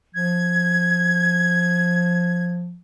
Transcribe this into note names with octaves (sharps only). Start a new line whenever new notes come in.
F3 G#6